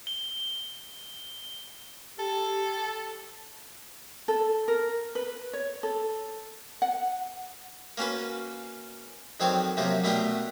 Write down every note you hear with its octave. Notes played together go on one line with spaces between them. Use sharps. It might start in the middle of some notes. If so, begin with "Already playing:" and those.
G7
G4 A4
A4
A#4
B4
C#5
A4
F#5
A#3 C#4 F#4 B4
F2 D#3 F#3 C4 C#5 D5
F#2 C3 F3 F#3 A#3
B2 A3 B3 D4 G4 A#4